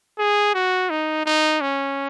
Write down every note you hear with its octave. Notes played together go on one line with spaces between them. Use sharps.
G#4
F#4
D#4
D#4
C#4